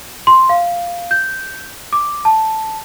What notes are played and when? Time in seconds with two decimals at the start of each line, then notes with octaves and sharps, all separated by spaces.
0.27 C6
0.49 F5
1.11 G6
1.93 D6
2.25 A5